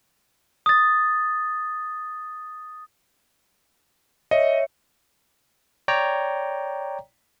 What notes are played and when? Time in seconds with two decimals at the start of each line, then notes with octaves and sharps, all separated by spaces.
0.66 D#6 A6
4.31 C#5 D#5 E5 C#7
5.88 C#5 D5 G5 A#5